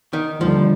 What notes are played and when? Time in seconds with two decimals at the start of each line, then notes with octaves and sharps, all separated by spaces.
0.13 D#3
0.41 D#2 D3 F3 G3